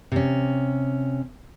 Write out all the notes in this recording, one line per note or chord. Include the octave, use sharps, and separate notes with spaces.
C3 C#4